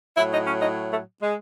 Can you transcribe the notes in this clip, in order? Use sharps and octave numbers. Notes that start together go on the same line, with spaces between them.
A2 F#3 E4
D#4
C#4
D#4
A3
G#3